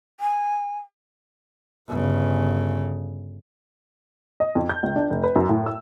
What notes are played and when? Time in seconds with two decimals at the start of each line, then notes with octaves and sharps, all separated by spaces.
0.20 G#5
1.89 G1 C#3
4.40 D#5
4.55 F2
4.69 G6
4.83 C#2
4.96 D4
5.10 F1
5.24 B4
5.36 F#2
5.49 A2
5.66 E6